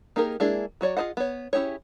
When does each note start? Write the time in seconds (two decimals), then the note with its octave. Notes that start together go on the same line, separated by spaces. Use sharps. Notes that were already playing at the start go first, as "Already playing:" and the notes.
0.16 A#3 D#4 G4 G#4 A#4
0.40 G#3 A#3 D4 E4 G#4
0.81 F#3 F#4 C#5 D5
0.97 F4 G#4 C5 D#5 F#5
1.17 B3 C#5
1.53 C#4 E4 G4 G#4 C#5